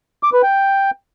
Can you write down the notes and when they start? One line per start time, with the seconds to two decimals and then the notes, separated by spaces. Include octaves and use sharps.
0.23 D6
0.33 B4
0.43 G5